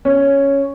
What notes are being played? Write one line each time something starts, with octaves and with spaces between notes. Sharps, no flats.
C#4